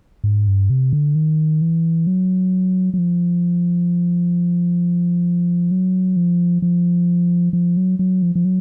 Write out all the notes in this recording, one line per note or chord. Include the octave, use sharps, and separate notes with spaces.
G#2
G2
C3
D3
D#3
E3
F#3
F#3
F3
F#3
F3
F3
F3
F#3
F#3
F3
F3
F#3